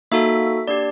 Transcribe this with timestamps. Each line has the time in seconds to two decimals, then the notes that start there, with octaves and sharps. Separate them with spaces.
0.12 A#3 D#4 F#4 A4 E5
0.68 A#3 D4 G4 D5